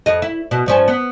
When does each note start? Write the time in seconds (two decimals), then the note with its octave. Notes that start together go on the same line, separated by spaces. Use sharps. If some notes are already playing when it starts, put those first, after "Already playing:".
0.06 F2 D#5
0.22 E4
0.51 B2
0.66 G2 F3 C#4
0.88 B3